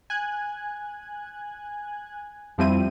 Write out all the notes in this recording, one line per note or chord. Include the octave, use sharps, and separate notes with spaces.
G#5 F#6 G#6
F2 F3 G3 C4 E4 D#7